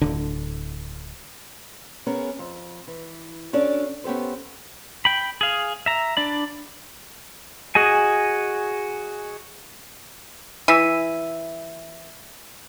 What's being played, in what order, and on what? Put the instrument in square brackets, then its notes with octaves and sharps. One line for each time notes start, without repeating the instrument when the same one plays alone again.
[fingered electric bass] D1 D3
[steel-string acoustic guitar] B3 C#4 G#4 A#4
F2
E3
C#4 D4 F#4 A4 D5
B3 C#4 G4 A4 C5
[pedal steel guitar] G5 B5
G#4 F5
E5 A#5
D4 D5 B5
F#4 G#4 D#5 G#5
[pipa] E3 [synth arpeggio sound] E6 B6 D#7